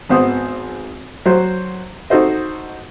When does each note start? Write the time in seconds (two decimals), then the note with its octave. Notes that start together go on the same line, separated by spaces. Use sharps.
0.09 G#1 B3 C5 F#5 D#6
1.26 F#3 F#4 C5
2.10 D#4 F#4 A4 C5 D#5